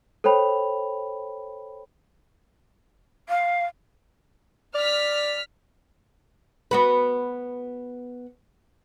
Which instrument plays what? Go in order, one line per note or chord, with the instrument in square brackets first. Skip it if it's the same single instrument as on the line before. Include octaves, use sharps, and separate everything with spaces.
[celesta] A4 C5 C#5 G5 B5 F7
[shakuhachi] F5
[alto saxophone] D5 [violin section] F6 B6
[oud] B3 F#4 B4